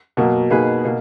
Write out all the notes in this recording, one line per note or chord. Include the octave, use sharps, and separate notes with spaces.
B2 F#3 A#3
B2 A#3 D#4 G#4 B4
B2 A#3